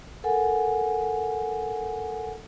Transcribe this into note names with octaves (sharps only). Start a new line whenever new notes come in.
A4 A#4 F#5 G#5